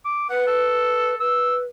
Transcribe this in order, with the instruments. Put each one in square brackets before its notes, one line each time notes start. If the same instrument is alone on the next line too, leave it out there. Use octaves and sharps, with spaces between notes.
[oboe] D6
[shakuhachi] B4 [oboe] F#5
[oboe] A4
[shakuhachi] B4 [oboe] E6